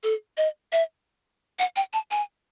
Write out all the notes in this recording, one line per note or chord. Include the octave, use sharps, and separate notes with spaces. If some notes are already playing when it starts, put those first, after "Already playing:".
A4
D#5
E5
F#5
G5
A5
G#5